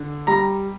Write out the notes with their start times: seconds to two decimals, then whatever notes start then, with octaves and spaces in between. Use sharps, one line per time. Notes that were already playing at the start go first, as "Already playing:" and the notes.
Already playing: D3
0.27 G3 A#5